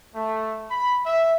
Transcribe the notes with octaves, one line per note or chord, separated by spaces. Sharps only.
A3
B5
E5